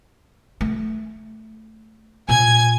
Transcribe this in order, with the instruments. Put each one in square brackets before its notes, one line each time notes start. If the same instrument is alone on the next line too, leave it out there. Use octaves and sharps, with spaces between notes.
[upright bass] A3
[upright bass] A#2 [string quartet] G#5 G#6